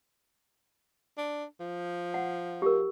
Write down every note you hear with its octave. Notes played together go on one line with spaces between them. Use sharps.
D4
F3
F#5
G4 A#4